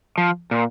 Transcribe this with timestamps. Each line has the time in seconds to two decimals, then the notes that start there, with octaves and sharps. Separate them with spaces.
0.18 F3
0.51 A#2